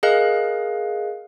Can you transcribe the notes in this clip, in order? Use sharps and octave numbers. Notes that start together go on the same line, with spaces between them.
G#4 A#4 D#5 F5 F#6